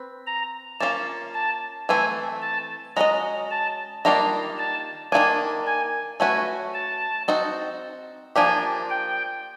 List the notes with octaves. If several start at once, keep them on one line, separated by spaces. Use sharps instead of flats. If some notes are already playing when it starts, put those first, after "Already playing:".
Already playing: C4 B4
A#5
A#3 C#4 F4 A5
A5
E3 A3 C4 G#5
A5
G#3 C#4 F#4 B4 D#5 A#5
A5
D#3 G3 A#3 D4 F4 A#5
A5
D#3 F#3 A#3 D4 G#5
G#5
A3 C#4 F#4 B4 G#5
A5
C4 D#4 F#4
F3 A#3 D4 G4 G#5
G5